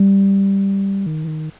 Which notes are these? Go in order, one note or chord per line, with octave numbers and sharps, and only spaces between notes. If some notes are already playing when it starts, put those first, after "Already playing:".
Already playing: G3
D#3
E3
D#3